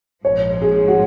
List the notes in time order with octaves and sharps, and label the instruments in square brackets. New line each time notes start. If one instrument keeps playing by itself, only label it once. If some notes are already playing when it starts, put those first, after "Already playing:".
[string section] A#1 G#2 F3 [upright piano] C#5
[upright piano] G#4
F#4